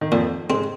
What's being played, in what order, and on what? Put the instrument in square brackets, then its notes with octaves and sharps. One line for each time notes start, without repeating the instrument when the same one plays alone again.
[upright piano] D#3
[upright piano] F2 F3 [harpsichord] A#2
[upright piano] G#2 G#3 [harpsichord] C4